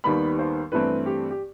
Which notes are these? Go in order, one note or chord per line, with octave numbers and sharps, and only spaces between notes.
D#2 D#3 G3 B3 B5
C5
G2 E3 A3 C4 B4
G4
G4